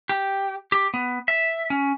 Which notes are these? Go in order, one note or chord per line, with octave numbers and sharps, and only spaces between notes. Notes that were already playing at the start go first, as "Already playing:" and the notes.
G4
G4
B3
E5
C#4